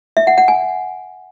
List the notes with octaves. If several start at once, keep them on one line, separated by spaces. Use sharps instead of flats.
E5
F#5
F#5
G#5